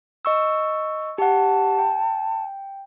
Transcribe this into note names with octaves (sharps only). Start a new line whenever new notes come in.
D#5 C#6 E6
G4 F#5 A5
G5